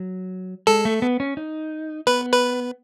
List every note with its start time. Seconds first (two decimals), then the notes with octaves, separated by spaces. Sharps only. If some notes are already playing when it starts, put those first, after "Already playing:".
Already playing: F#3
0.67 G#3 A4
0.85 A3
1.02 B3
1.20 C#4
1.37 D#4
2.07 B3 B4
2.32 B4